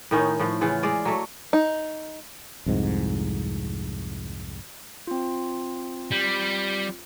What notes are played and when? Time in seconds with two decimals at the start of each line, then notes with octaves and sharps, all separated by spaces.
0.11 A2 D#3 C#4 D#4
0.40 A2 F3
0.61 C#3 E3 F4 F#5
0.83 G#3 D5
1.05 F#3 A3
1.53 D#4
2.66 C2 F2 G#2
5.07 C4 F4
6.12 G3